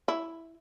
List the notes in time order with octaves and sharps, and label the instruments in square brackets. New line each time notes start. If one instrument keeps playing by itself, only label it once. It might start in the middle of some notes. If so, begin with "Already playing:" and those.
[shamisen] E4